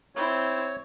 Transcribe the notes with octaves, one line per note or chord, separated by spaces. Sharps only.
C4 E4 C#5